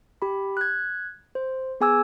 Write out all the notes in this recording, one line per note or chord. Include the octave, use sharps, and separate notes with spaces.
G4 B5
F#6 G#6
C5
B3 G#4 G#5 D6 E6 G#6